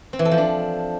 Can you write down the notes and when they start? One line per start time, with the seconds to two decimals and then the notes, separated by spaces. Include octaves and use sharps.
0.13 C4
0.19 E3
0.25 A4
0.32 F3
0.38 D4